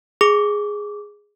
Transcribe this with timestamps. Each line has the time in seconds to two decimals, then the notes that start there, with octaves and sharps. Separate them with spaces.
0.21 G#4 D6